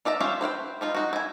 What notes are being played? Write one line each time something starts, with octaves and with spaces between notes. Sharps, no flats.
D#4 D5 E5 A#5
C#4 F4 G4 E5 F5
B4 C5 F5 G5
G3 D#4 F4
D#4 F#4
E4 G#5